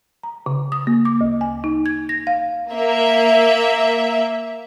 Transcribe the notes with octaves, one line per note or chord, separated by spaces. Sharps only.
A#5
C#3
D#6
A#3
D6
D2
G#5
D#4
G#6
A#6
F5
A#3 E5